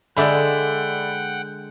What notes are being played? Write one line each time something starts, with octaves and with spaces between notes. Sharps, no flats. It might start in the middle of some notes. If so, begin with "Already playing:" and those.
D3 G#3 D5 E5 F#5 G5 B5